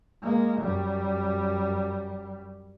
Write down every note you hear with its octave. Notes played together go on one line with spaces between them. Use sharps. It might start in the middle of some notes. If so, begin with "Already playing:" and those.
G#3 A#3
F#2 G3